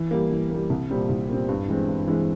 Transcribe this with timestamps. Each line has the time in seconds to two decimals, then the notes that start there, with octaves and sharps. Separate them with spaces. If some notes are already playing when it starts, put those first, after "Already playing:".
Already playing: E3
0.11 G3 A#3
0.30 E3
0.50 G3 A#3
0.70 C2
0.90 A#2 G3 C4
1.09 C2
1.29 A#2 G3 C4
1.49 G2
1.68 E3 G#3 C4
1.88 G2
2.08 E3 G#3 C4